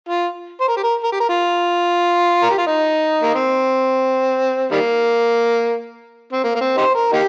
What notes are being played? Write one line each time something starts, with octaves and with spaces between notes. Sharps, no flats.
F4
C5
A#4
G4
A#4
A#4
G4
A#4
F4
A#4
G4
F4
D#4
A#3
C4
D#3 G3 A#3
C4
A#3
A#3
C4
D#4 G4 C5
A#4
A#3 D#4 G4